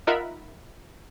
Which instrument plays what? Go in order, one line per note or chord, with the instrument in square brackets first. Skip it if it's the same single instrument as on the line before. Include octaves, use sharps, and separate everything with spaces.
[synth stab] D#4 F4 A#4 E5 F#5 B5